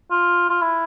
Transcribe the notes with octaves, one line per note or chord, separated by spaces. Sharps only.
F4
F4
E4